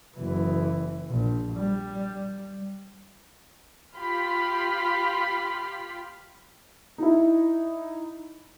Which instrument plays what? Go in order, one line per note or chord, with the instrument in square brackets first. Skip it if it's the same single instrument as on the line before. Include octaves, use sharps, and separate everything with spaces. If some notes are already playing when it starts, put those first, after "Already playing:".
[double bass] F#1 E3
A#1
G3
[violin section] F4 G4 B5 C6 F6 B6
[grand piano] D#4 E4